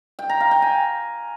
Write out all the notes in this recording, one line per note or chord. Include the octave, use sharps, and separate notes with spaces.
G5
A#5
F5
G5
G#5